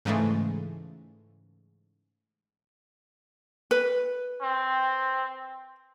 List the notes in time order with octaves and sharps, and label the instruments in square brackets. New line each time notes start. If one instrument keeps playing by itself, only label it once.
[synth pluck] G#2 C#3 E3 G#3 A3
[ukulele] B4
[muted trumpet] C4